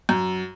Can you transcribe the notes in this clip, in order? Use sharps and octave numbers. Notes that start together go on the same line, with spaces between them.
F#2